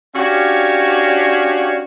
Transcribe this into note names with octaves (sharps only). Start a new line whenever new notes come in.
C#4 D4 F#4 G4 C#5 F5